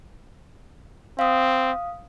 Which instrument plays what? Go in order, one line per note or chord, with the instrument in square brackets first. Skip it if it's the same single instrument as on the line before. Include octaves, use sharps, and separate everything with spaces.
[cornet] C4 [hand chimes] F5 D#6